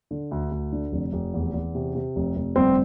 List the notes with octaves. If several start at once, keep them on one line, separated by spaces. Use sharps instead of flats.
D3
D2
D2
D3
F1
F1
E2
E2
C3
C3
F1
F1
G1 C4